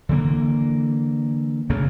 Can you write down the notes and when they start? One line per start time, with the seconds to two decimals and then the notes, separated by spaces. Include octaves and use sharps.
0.09 D3 E3 G3 A#3
1.70 D2 C#3 A3 A#3